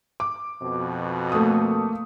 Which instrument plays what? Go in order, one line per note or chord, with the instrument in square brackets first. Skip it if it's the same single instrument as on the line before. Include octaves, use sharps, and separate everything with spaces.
[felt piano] D6
[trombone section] F2 B2
[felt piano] A3 D#6 [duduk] A#3